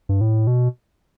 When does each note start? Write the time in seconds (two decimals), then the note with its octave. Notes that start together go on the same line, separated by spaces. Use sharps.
0.09 G2
0.21 A2
0.47 B2